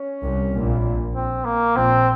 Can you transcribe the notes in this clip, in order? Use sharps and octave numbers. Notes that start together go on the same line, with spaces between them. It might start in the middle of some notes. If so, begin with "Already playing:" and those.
Already playing: C#4
C2 C3
A#1 A#2
C4
A#3
A#1 A#2 C4